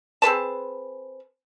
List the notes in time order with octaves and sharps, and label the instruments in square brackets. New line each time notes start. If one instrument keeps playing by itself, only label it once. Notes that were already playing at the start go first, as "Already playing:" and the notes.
[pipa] C4 G#4 B4 A5